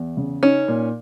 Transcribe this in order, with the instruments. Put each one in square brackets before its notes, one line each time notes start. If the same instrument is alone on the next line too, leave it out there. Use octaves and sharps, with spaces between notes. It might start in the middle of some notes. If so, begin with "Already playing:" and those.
Already playing: [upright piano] E2
C#3
[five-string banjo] C#4 [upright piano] D#4
[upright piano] A#2